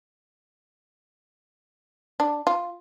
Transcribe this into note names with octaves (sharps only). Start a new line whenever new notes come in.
D4
F4